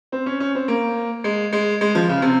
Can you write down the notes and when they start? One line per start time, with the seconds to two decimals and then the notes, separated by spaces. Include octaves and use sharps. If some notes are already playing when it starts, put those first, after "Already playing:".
0.12 C4
0.26 C#4
0.40 C#4
0.55 C4
0.68 A#3
1.24 G#3
1.53 G#3
1.81 G#3
1.95 F3
2.09 C#3
2.22 C3